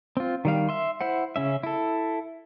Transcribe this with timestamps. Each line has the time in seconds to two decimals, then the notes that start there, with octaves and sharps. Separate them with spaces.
0.17 C4 F4
0.45 D#3 G3 F5
0.69 E5 C6
1.01 E4 C5 F#5
1.36 C#3 C#4 E5
1.63 E4 A4